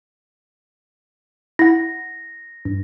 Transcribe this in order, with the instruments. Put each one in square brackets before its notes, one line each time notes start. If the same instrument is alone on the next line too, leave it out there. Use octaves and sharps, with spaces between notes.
[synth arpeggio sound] E4 F#5 [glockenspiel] A#6
[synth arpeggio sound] G2